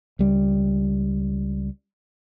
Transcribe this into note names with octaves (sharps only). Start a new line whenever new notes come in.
C#2 G3